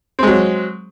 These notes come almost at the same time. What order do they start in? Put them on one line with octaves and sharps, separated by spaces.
C4 G#3 F#3